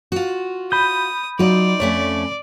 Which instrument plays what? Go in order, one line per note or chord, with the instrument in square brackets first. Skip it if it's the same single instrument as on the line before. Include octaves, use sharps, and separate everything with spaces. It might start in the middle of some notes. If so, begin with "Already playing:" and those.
[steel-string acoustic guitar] F4 F#4
[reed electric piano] B5 G6 [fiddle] D#6
[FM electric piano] F#3 F#4 [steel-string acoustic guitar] D#4 F4 [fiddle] D5
[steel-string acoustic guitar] F2 A3 C#4 [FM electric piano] C#5